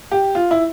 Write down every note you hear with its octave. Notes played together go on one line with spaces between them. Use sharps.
G4
F4
E4